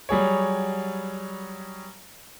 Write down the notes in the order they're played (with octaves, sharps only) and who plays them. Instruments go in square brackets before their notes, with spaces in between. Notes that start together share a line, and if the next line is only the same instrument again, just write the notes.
[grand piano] F#3 G3 G#4 C#5